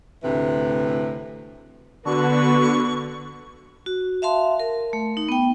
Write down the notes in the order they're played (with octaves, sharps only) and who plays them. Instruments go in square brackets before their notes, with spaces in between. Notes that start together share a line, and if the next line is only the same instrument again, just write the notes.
[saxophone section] D2 A2 C3 E3 B4
[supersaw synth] D3 [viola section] B3 F#4 B4 [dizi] C#6
[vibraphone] F#4
E5 F5 A5 C6
A#4
A3
D#4
B3 G5